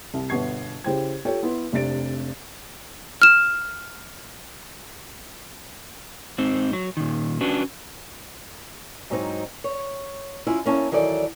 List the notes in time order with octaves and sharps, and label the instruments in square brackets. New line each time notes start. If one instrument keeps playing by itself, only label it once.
[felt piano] C2
G1 B2 B3 C#6 G#6 C7
C#3 E4 G4 C5 G5 G#6
F4 G4 A4 C#5 G5
B3 E4 C6
F1 C3 D4 A6 D7
[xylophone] F6 E7
[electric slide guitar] G#2 C4 D#4
F#3
A#2 D#3
C#4 D4 F#4 B4
[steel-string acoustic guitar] G#2 F#3 B3 C4 D#4
C#5
C#4 E4 F4
A#3 C#4 E4 A5
D#3 E3 F#3 A4 D5